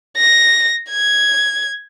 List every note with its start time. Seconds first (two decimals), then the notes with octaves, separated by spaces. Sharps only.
0.17 A#6
0.90 G#6